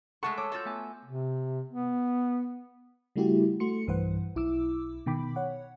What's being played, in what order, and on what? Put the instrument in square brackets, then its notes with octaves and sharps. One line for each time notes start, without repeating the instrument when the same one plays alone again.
[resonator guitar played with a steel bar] G#3 A3 A4 [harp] F#5 C#6
[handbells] C#5 A5 E6 [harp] D6
[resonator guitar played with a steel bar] F4 F#4 A4 [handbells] E6 G6
[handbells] A3 B3 G#5
[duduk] C3
B3
[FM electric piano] C#3 G3 A3 E4 F#4 G4
A3 F#4 C6 C#7
B1 G2 E3 B4 C5 F#5
B1 E4 D6 E6
B2 D#3 G5 B5 D6
C#5 F#5